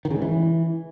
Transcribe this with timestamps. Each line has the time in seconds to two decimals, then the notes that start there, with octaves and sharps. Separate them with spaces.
0.05 D#3
0.10 C#3
0.16 G#2
0.22 E3